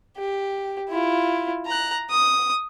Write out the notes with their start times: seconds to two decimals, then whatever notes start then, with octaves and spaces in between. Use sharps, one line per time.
0.17 G4
0.90 E4 F4
1.66 A#5 F#6
2.11 D#6